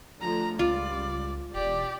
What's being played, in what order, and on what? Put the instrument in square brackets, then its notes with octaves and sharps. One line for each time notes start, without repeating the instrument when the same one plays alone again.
[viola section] D3 F3 A3 [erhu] A#5
[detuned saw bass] C#2 [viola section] G3 [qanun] F4 [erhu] D5
[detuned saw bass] E1 [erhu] G4 [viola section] D5